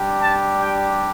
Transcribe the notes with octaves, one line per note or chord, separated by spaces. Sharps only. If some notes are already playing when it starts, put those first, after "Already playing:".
Already playing: G3 D4 G4
A5
G5